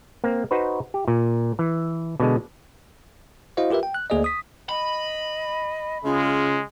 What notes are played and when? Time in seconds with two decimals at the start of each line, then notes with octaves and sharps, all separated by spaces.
0.24 A#3 C4
0.51 D#4 F#4 B4 C5
0.94 G4
1.08 A#2
1.59 E3
2.20 B2 D3 G#3
3.57 E4 F#4 C5 D#5 F5
3.71 F4 G4 A#4 B4 E5
3.83 G5
3.94 F#6
4.10 D2 A#3 G#4 D5 D#5
4.24 D#6 B6
4.69 D#5 B5
6.05 C#3 G#3 F4